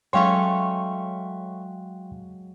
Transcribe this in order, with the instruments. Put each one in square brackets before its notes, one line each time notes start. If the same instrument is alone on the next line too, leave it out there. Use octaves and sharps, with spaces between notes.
[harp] F#3 G#3 [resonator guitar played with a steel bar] A3 C#4 C#5 [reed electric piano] F5 G5 C6